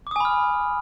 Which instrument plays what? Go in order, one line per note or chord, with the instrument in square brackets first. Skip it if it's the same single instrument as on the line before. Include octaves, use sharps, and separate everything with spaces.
[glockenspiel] D6
D#6
G#5
B5
F6